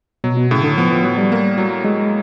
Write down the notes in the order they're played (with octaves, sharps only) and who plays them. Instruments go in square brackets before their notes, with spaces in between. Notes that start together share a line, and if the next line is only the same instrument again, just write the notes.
[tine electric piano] B2 [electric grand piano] F#3
[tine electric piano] B2
[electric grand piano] A2 [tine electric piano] C#3
[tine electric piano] D3
[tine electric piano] F3 [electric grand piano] B3
[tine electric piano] F3
[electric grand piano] A2 [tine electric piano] F#3
[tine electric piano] G3
[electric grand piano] A#3
F#3
[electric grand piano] F#3 [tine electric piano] G#3